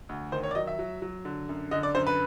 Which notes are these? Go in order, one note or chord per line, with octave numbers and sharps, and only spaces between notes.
D2
D#3 C5
C#5
D5
F#3 D#5
E5
F#3
F#3
D3
F#2
D3 D#5
D5
F#2 C5
B4